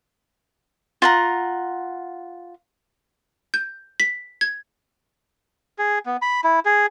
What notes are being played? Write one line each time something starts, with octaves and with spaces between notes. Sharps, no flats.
F4 F#5 A#5
G6
B6
G#6
G#4
B3
B5
E4
G#4